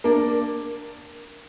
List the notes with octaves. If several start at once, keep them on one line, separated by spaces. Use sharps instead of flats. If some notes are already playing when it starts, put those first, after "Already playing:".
A#3 D4